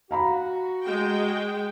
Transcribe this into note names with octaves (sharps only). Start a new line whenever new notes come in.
F#4 F5 A#5 B5
G#3 G5